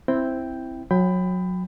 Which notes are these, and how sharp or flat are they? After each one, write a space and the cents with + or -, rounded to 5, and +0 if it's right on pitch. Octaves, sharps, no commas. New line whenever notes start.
C4 +0 E4 +0 G5 +0
F#3 -20 G5 +15 B5 +20